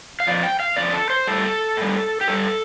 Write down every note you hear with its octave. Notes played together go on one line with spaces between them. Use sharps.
F5
F2 F3 D5
G5
F5
F2 F3 D5
A4
C5
A2 G3 A4
A2 G3
G4
G2 G3 A4